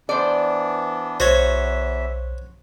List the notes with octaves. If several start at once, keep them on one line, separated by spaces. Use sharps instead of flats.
E3 B3 D4 C5 D5
B1 E2 F#4 C5 C#5 E5